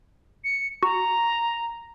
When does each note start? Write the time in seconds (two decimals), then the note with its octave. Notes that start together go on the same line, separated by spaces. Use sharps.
0.44 C#7
0.83 F#4 A#5